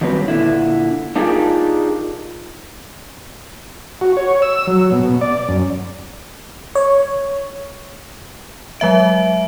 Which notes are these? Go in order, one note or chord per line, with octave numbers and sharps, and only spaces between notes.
D#3 F#3 G3 C4 B4
A#2 D3 E4
D4 D#4 F4 G4 G#4 A#4
F#4
C#5
E6
F#3
B2
B2
D5
F#2
C#5
F#3 G#3 E5 D7